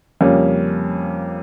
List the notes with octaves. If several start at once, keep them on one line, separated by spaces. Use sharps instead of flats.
F2 C#3 G3 A#3 C#4